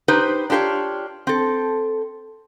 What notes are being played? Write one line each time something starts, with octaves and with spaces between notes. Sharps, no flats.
D#4 G4 B4 C5
D4 F4 G4 A4 C#5
C4 A4